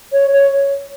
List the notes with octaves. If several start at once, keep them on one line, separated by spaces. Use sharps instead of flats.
C#5
C#5